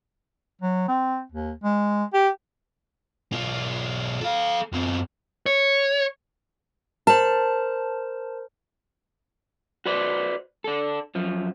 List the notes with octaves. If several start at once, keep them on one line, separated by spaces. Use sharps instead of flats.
F#3
C4
D#2
G#3
G4
B1 F4
A4 F5
F#2 C4
C#5
A#4 C5 A5
F#4 B4 C5 D5
D4 A4
F#2 F3